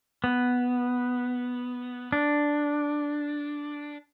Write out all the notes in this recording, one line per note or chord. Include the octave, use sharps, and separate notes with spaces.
B3
D4